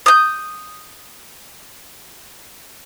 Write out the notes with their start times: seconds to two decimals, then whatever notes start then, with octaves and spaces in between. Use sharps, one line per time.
0.06 D#6 G6